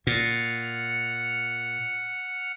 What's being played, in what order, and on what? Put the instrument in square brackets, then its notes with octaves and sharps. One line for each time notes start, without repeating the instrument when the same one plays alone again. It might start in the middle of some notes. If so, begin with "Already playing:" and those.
[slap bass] A#2 [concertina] F#5 F6